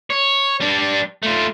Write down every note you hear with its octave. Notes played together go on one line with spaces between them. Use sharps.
C#5
G3 D4
A3 F4